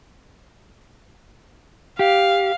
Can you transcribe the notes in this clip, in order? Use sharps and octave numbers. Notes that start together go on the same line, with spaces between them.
G4 F5